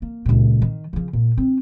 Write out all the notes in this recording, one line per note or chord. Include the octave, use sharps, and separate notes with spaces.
A#3
C#2 A#2
D#3
C#3 F3
A#2
C4 D4